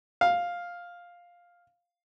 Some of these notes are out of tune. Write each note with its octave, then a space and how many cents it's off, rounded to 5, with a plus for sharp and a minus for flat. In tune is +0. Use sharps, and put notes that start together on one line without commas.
F5 +5